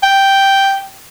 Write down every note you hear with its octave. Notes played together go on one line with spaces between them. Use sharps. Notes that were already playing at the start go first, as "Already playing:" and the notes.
G5